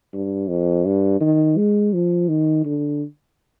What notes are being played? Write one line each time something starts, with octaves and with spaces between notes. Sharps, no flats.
G2
F2
G2
D#3
G#3
F3
D#3
D3